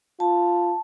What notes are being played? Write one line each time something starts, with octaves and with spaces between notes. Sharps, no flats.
F4 A5